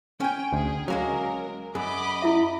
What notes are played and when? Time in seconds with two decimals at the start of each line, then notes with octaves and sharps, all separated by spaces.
0.20 C#4 G5 G#5
0.53 D2 G#4
0.88 F#3 G#3 A#3 C#4 A#4
1.75 F#2 G#4 D#5 B5 D6
2.22 E4 F4 E5